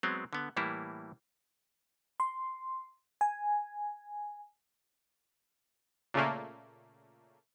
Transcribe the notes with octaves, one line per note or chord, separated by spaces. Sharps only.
F#3 G#3 B3 C4
D3 B3
A2 E3 G3 A#3 E4
C6
G#5
A#2 C#3 A3 A#3